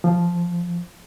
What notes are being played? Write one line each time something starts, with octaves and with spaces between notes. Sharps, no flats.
F3